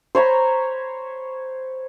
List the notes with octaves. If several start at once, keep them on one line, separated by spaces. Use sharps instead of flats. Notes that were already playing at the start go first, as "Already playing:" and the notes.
C5 C#5 A#5 B5